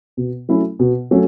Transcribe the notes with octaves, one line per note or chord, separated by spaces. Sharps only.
B2
F#3 A3 C#4 E4
B2
F#3 A3 C#4